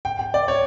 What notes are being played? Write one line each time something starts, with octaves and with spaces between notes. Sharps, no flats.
G5
G5
D5
C#5